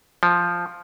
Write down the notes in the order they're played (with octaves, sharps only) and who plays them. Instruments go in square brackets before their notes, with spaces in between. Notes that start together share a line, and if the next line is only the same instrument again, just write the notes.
[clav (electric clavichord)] F3